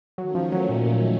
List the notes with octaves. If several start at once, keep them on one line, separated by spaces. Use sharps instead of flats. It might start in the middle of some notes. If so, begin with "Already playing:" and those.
D#3 F#3 A3 C#4
F3
F#3
A#2
A#2